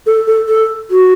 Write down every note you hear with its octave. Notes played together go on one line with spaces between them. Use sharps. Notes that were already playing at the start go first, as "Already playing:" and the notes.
A4
A4
A4
F#4